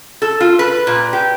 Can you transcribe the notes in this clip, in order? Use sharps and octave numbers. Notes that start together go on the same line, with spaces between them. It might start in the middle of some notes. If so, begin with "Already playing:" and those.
A4
F4
B4
A#2
G4